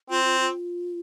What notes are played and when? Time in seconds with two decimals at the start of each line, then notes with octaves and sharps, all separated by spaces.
0.10 C4 F4
0.24 F4
0.40 F4